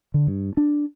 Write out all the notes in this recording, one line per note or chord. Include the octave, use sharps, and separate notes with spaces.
D3
G2
D4